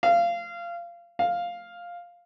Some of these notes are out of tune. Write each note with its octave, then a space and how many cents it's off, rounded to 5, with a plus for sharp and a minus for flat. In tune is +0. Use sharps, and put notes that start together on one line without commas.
F5 -20
F5 +5